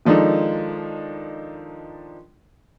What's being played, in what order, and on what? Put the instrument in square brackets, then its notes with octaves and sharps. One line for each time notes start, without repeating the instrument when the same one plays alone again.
[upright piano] D#3 F3 G#3 D4 D#4 A4